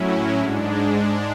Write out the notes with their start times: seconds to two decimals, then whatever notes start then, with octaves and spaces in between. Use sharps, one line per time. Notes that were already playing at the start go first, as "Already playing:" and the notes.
Already playing: A2 F#3 C#4 E4
0.39 G#2 G#3 D4